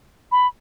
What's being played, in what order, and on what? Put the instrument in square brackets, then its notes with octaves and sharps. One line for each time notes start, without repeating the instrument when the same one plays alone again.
[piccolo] B5